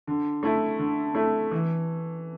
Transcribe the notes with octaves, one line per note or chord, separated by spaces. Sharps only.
D3
A3 E4
D3
A3 E4
E3